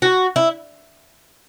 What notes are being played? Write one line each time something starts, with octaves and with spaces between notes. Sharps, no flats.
F#4
E4